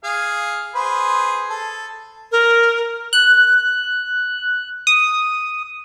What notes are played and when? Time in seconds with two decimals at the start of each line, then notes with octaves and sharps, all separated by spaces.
0.04 G#4 F5
0.75 G#4 B4 C5
1.50 A4
2.32 A#4
3.13 F#6
4.87 D#6